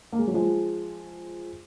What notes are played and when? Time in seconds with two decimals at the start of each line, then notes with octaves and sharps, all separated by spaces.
0.12 A#3
0.19 G#3
0.27 F#3
0.34 F3 G#3